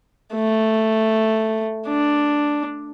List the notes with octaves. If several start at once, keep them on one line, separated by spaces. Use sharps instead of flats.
A3
D4